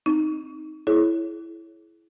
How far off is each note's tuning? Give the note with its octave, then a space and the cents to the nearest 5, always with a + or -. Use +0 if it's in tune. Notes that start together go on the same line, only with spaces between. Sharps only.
C4 +0 D#4 +0
E4 +5 G#4 +40 C#5 +0